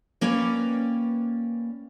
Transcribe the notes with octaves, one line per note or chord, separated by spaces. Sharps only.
A#3 C#4 B4 D5 G5